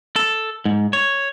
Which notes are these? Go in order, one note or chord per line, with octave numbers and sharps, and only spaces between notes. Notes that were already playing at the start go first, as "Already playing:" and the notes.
A4
G#2
C#5